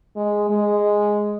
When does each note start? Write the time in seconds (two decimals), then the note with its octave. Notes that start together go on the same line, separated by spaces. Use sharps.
0.16 G#3
0.50 G#3